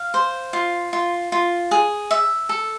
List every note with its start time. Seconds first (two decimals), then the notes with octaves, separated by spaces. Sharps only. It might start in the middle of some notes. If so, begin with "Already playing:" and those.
Already playing: F5
0.14 C5
0.53 F4
0.93 F4
1.32 F4
1.71 G#4
2.11 E5
2.49 A4